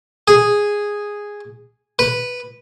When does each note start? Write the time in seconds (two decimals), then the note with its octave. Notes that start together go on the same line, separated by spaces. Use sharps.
0.28 G#4
1.99 B4